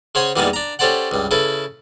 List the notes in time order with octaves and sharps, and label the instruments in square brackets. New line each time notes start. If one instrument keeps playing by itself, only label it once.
[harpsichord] C#3 C5 C#5 F#5 G#5 C6
E2 A#2 G3 G#3 B3 D#4
D4 A#5
C#4 G4 A4 C5 D5 F#5
C#2 G2
C#3 E4 A4 B4